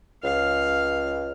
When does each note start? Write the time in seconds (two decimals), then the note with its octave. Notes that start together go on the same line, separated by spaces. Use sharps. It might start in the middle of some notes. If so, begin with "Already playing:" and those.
0.23 C#2 F5